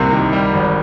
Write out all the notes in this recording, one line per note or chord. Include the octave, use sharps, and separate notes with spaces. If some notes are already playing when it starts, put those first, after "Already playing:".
Already playing: C2 C3 A#3
D#3
G3
G#1